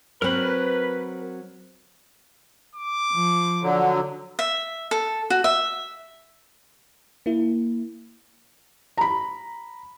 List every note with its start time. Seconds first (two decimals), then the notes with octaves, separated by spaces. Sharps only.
0.22 F#3 C4 A#4 B4 B5
2.75 D6
3.12 F3
3.63 D3 F#3
4.39 E5
4.91 A4
5.30 F#4
5.44 E5
7.26 A#3 E4
8.98 A#5 B5